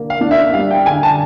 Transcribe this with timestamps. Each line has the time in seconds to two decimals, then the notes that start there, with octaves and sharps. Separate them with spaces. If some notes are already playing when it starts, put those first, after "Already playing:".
Already playing: D3 A#3
0.10 F5
0.21 D4
0.31 E5
0.53 G3 F5
0.70 G5
0.86 D3 G#5
1.03 A5